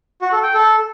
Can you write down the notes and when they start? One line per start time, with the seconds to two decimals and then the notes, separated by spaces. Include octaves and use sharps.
0.22 F#4
0.32 A4
0.43 G5
0.54 A4